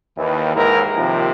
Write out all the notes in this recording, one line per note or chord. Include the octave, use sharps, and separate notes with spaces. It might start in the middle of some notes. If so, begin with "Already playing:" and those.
D#2 E3
D#2 G#2 E4 A#4
D#2 C3 F3